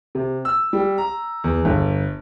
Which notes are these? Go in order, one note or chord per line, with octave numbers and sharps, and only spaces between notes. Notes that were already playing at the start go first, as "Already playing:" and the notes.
C3
E6
G3
A#5
E2
G1